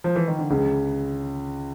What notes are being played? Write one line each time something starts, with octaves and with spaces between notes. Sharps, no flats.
F3
E3
D#3
D3
C#2 C#3